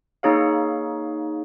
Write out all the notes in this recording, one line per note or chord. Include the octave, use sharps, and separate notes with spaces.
A#3 D#4 G#4 C#5 F5